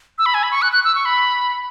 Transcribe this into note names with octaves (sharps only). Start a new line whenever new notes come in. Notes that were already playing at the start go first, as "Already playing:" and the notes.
E6
B5
G#5
B5
C#6
F#6
F#6
E6
C#6
B5